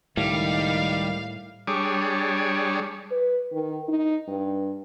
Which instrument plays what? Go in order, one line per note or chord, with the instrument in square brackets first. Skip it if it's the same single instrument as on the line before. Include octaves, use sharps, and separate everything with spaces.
[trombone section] C#2 D#3 [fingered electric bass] A2 [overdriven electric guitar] G3 [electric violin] F5
[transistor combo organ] G3 D4 G#4 C#5
[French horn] B4
D#3
D#4
G2